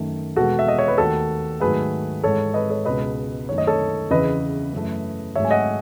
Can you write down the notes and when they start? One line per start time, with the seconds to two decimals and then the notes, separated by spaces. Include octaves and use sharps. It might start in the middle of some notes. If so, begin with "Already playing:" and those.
Already playing: F#2 D#3 A3
0.36 E2 B2 G#3 F#4 A4
0.59 E5
0.68 D#5
0.79 C#5
0.88 B4
0.98 D#2 D#3 A3 F#4 A4
1.60 G#2 D#3 F#3 A3 G#4 B4
2.23 G#2 E3 G#3 A4 C#5
2.54 B4 D#5
2.70 A4 C#5
2.85 C#2 B2 G#3 B4 D#5
3.48 F#2 D#3 A3 C#5
3.58 D#5
3.67 A4 C#5
4.10 E2 C#3 E3 B4 D#5
4.73 F#2 E3 A3
5.35 G#2 F#3 A3 C#5 E5
5.45 G#5
5.51 D#5 F#5